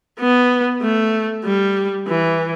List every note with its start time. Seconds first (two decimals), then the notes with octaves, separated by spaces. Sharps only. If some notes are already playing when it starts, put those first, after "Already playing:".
0.19 B3
0.82 A3
1.45 G3
2.08 E3